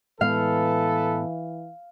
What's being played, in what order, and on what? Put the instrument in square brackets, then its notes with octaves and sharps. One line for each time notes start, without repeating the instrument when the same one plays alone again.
[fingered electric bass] A2 G#3 B3 [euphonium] E3 [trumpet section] A4 B4 [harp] F5